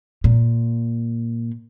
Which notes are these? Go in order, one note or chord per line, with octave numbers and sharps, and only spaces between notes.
A#2